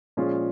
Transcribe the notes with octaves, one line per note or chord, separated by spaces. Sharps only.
A#2 F3 G#3 C#4 F4